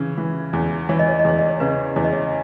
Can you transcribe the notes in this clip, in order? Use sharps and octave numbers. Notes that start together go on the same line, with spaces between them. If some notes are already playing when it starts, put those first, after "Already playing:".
Already playing: C#3 E3
E3
E2
E3 C#5
D#5
C#5
D#5
E2 C#5
D#5
C#5
C#3 B4
E2 C#5
D#5
C#5